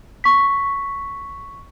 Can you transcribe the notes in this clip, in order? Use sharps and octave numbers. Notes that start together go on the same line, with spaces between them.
C#6 B6